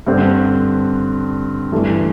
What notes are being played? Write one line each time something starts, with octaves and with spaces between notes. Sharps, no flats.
G2 D3 C4
G2 E3 A3